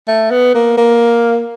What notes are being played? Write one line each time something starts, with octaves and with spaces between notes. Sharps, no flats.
A3
B3
A#3
A#3